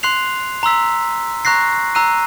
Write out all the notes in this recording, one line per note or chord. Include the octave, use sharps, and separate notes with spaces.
C6 F#6 C7 F7
A#5 C6 E6 B6
A#5 C#6 F#6 A#6 C7
A#5 E6 F#6 C7 D#7